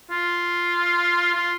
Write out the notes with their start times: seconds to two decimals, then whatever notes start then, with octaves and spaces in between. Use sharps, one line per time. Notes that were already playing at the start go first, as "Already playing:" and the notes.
0.11 F4
1.34 F4